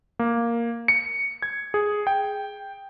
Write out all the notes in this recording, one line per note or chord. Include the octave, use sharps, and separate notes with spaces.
A#3
C#7
G#6
G#4
G5